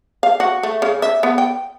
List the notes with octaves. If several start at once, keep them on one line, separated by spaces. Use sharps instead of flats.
F5
F#4
A3
C#3
E5
B3
G5